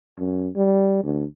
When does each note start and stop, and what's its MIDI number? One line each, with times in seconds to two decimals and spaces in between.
0.19 0.49 42
0.56 1.00 55
1.03 1.25 38